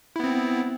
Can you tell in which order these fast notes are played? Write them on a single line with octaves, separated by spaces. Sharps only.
E4 B3 C4